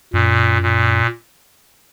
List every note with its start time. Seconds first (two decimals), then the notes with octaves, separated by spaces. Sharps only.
0.13 F#2 A#2
0.63 A#2